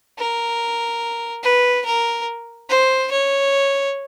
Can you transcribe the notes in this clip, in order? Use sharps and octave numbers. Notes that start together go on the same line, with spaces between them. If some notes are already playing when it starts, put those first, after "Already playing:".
A#4
B4
A#4
C5
C#5